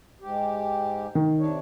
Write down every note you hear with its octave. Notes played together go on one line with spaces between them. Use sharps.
G#2 G4
D#3
C3 D4 C#5